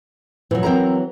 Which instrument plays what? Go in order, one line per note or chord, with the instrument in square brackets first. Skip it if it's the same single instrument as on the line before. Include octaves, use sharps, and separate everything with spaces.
[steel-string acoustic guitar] A#2 [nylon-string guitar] E3 F#3
[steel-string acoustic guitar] C4 A#4 A#5